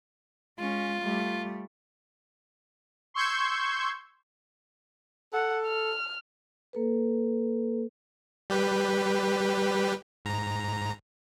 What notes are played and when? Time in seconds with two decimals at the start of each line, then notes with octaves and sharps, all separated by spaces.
0.58 G#3 C#4 F4
1.02 G3 A3
3.14 C6 C#6 E6 G6 G#6
5.33 A4 F#5
5.66 F6
6.73 A#3 A4 B4
8.50 G3 G4 B4
10.25 G#2 A#5